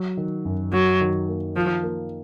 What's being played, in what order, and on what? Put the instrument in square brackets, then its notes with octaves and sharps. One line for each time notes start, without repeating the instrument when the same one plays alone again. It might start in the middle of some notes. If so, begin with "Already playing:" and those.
Already playing: [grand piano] F#3
D#3
F#2
[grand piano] F#2 [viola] F#3
[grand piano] D#3
A#3
[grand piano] D#3 [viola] F3
[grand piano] A#3